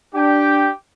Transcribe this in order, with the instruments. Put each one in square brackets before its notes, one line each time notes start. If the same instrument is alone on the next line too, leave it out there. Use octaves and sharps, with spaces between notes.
[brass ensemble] D4 [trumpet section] G4 G5